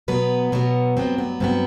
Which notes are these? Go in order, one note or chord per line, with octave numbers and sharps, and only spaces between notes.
B2 F#3 B3 B4
B2 F#3 B3
G2 F#3 B3 C4
B3
G2 F#3 B3 C4